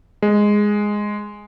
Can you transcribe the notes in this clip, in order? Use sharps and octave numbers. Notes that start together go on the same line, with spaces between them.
G#3